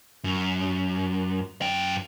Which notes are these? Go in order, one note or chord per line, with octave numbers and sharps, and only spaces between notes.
F#2
F#2 G5